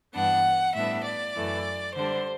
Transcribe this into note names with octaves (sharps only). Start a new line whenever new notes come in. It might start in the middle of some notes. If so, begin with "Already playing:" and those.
G2 E3 B3 D4 F#5
A2 G3 B3 D4 E5
D5
F#2 E3 A3
D3 G3 D4 C5